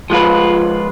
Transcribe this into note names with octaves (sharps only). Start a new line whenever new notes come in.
F3 G#3 F4 B4